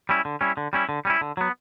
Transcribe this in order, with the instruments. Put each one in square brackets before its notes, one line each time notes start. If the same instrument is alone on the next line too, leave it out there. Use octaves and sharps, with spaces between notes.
[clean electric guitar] G3 C#4 E4
D3
G3 C#4 E4
D3
G3 C#4 E4
D3
G3 C#4 E4
D3
F#3 B3